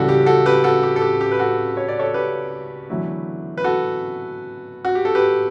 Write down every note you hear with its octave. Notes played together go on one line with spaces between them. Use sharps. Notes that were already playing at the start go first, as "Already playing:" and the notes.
Already playing: C#2 C#3 E3 G3 F#4 A4
G4
F#4 A4
G4 B4
F#4 A4
G4
A4
G4
G4
B4
F#4 A4
C#5
D5
A4 C#5
G4 B4
E2 D3 F#3 A3 E4
B4
F#4 A4
F#4
G4
A4
G4 B4